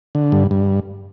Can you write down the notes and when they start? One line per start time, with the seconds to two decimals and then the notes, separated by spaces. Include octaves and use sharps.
0.15 D3
0.32 G2
0.51 G2